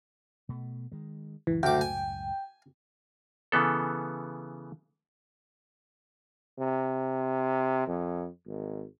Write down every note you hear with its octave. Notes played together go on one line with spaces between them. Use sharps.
B2 A3
D#3 G#3
C#2 F#2 A2 E3
D2 G5 D6
G#5
C#3 E3 B3 A4
C3
F2
G#1